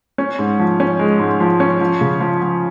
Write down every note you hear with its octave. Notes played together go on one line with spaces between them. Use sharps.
C#4
G#2
F3
C#4
G#3
G#2
F3
C#4
F3
C#3
F3
F3